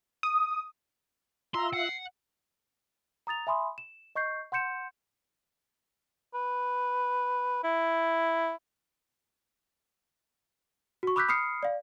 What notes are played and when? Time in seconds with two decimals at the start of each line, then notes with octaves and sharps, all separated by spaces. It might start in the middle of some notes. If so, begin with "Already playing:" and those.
0.23 D#6
1.54 F4 E5 A#5 C6
1.74 F#5 C7
3.27 A#5 D#6 A6 F7
3.47 E5 G#5 B5 C6 D#6
3.78 E7
4.16 D#5 C#6 G6 C7
4.52 F#5 C6 G6 C#7 E7
6.34 B4
7.64 E4
11.03 F#4 C#6
11.16 B5 D6 E6 F#6 G6 B6
11.28 B5 D#6 F6 C7 C#7
11.63 D5 F5